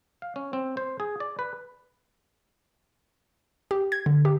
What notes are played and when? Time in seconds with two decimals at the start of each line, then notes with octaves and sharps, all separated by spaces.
0.22 F5
0.36 C#4
0.53 C4
0.77 C5
1.00 G#4
1.20 D5
1.39 B4
3.71 G4
3.92 G#6
4.06 D3
4.25 G4